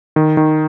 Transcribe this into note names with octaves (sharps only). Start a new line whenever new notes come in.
D#3
D#3